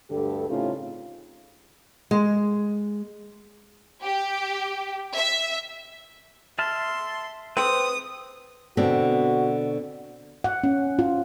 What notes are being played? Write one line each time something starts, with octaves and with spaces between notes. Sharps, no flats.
D2 G2 D3 G4 A4
A2 C#3 C4 C#4 D#4 F4
G#3
G4
E5
E5 A5 C6 F6
C4 B4 D#6
B2 D3 C4 F#4
F#5
C#4
F4